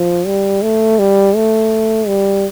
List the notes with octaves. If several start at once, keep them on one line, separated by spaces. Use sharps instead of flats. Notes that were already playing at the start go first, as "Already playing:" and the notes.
Already playing: F3
G3
A3
G3
A3
G3